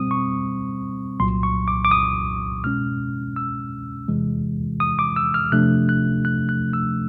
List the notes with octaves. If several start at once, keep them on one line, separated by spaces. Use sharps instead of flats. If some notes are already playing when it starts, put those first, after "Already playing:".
Already playing: B2 G3 C4 D#6
C#6
C2 A#2 F#3 C6
C#6
D6
D6
D#6
B2 G#3 C#4 F6
E6
E2 C3 E3 G#3
D#6
D6
E6
F6
C3 F3 A3 D4 F#6
F#6
F#6
F#6
E6